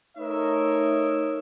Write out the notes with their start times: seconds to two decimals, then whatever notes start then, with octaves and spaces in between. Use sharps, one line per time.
0.17 A3 D#4 A#4 C#5 D#5 E5